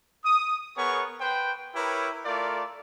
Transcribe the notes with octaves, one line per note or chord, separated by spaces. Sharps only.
D#6
B3 G#4 A#4 C#5 C#6
B4 C5 G5
E4 G4 A#4 B4 C#5
A3 F4 A#4 D5